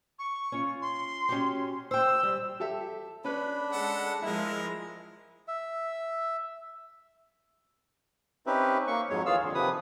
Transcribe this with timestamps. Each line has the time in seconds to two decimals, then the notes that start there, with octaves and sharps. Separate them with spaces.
0.19 C#6
0.52 C#4 F4
0.82 C6
1.29 C#4 F#4 G4
1.91 C5 G5 E6
2.23 G3
2.60 G4 A4 E5
3.25 C#4 D4 B4 B5
3.72 G#3 A4 F#5
4.22 F3 G#3 E4 A#4 E5
5.48 E5
8.46 C4 C#4 D#4 G4 B4 E5
8.87 A#3 C#6
9.10 F2 G#2 F#3 G#3 C#5
9.26 D#2 E3 F4 G#4 F5 E6
9.42 F2 D3
9.54 C3 D#3 F3 B4 D#6